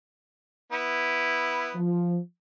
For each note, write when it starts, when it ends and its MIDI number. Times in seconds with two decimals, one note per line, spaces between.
0.72 1.75 59
0.72 1.75 64
1.75 2.18 53